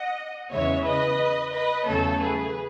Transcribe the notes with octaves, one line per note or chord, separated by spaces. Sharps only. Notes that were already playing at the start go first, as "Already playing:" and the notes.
Already playing: D#5 F#5
E2 C#3 E3 G#3 C#5 E5
B4 D#5
B4 D#5
E2 C#3 F#3 A3 A4 C#5
G#4 B4